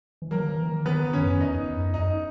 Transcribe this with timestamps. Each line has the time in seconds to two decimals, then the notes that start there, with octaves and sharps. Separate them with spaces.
0.22 E3
0.31 F#3 A#3 A#4
0.40 D#3
0.49 E3
0.63 E3
0.68 D#3
0.85 D#3 B3 B4
1.04 D#3
1.13 G#2 C#4 C#5
1.22 F#2
1.40 E2 D#4 D#5
1.58 E2
1.76 F#2
1.94 F#2 D#4 D#5